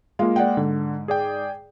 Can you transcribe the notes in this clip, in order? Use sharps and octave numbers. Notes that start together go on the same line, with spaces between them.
G#3 A#3 F4
D5 F#5 G5
G#2 D3
G#4 D5 G5